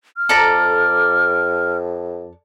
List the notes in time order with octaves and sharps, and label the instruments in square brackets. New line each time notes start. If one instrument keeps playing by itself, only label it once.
[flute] F6
[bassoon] F2 [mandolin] A4 D5 A#5